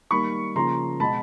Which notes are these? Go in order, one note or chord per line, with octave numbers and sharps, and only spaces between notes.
D#3 G3 A#3 B5 C#6
C#3 F3 A#3 A#5 C6
B2 G#3 A5 B5